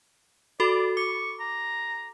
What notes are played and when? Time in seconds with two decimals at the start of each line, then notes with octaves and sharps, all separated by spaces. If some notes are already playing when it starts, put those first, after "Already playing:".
0.60 F#4 A4 D5 B5
0.97 C#6 D6
1.40 A#5